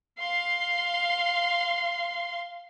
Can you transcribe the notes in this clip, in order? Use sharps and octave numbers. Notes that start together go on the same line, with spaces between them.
F5 C6